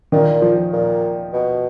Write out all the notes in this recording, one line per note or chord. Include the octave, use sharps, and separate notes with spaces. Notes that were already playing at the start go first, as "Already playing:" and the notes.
A#2 D#3
F3
A#2
B2